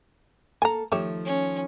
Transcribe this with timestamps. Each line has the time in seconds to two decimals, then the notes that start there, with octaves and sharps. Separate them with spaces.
0.62 A#3 A4 G#5 A#5
0.92 D#3 F3 A3 G4 C#5 E5
1.25 C#4